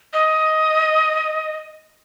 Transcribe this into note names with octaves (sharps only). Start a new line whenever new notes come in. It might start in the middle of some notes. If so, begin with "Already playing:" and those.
D#5